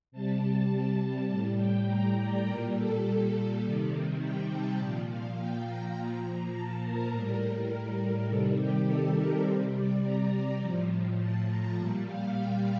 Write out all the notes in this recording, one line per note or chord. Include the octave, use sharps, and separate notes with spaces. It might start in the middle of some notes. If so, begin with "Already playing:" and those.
C3 G3 A5
A2 G3 A5
G5
A#5
D5
A#2 G3 A#4
A4
C3 D#3 G3
G5
A5
A#2 F3 D5
F5
G5
A#5
A#2 F3 A#5
A5
A#4
A2 G3
C3 D#3 G3 A4
G4
A4
A#4
C3 G3 C5
D5
A#5
A2 F3
A5
A#5
A#2 G3 A5
F5
G5